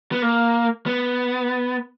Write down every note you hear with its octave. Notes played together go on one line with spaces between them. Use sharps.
B3
A#3
B3